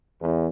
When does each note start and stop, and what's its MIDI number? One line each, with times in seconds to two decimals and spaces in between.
0.21 0.47 40